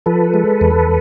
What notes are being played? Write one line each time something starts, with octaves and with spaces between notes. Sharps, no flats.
F3 A4 B4
G#3
E2